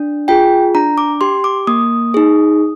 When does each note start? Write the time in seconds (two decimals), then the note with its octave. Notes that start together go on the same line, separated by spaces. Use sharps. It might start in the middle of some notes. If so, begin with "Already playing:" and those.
Already playing: D4
0.28 F4 G#4 G5
0.75 D4 A#5
0.98 D6
1.21 G4 C6
1.44 D6
1.67 A#3 D#6
2.14 D#4 G#4